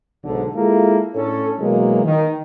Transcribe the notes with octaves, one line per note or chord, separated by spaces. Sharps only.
B1 G#2 D3
G#3 A#3 E4 F4 A4
A2 C#4 D4 A4
B2 E3 F#3 G#3 A#3
D#3